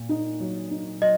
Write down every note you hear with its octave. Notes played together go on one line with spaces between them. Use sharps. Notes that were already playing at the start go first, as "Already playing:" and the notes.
Already playing: A#2
D#4
F#3
D#4
F#3 D#5